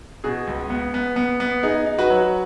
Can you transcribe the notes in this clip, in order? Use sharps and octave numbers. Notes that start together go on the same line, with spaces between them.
B2 G#4
C#2
B3
B3
B3
B3
D#4 G#4
D#4
F#4 B4
F#3